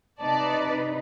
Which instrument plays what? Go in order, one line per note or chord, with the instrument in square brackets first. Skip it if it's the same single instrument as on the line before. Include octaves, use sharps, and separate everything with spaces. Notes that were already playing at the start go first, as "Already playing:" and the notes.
[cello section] C3 D#4 B4 [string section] D5 A5